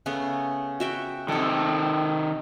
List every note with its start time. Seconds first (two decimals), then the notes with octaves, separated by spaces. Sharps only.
0.06 C#3 A3 B3
0.80 F#4 E5 G5
1.28 C3 D#3 A4 D6